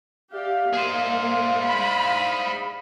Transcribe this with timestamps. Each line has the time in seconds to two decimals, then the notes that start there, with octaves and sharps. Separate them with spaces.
0.33 G4 D5 E5 F5
0.73 A#3 G#4 C5
1.64 B5